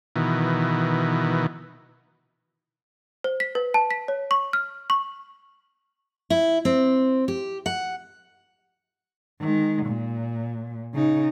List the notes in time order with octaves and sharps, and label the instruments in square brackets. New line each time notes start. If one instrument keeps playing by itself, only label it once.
[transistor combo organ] B2 D#3 E3
[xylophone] C5
B6
B4
A5
B6
C#5
C#6
F6
C#6
[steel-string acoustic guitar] E4
C4
G4
F#5
[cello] D#3 G#3
A#2
C#3 D#4